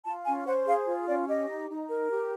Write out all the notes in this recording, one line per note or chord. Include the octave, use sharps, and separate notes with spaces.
F4 A5
C#4 G#5
C5 F#5
G#4 F5
F4
C#4 D5
G4 D#5
D#4
D#4
A#4
G4